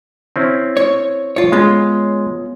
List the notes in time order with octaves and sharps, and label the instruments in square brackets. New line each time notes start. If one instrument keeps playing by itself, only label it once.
[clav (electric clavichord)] C4 C#4 E4
[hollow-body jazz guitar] C#5
F4 C#5
[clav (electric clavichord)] G#3 [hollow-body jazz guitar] B3 C#4 F4